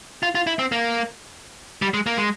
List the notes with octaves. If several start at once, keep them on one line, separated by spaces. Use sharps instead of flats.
F4
F4
E4
C4
A#3
G3
G#3
A#3
G#3